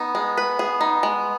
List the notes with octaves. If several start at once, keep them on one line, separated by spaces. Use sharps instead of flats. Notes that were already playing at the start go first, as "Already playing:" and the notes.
Already playing: B3 D#4
G#3
B4
G#4
D#4
G#3